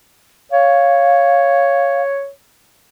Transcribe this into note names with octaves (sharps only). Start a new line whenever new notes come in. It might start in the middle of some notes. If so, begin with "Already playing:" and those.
C#5 F5